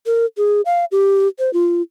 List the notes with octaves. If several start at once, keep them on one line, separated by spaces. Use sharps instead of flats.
A#4
G#4
F5
G4
C5
F4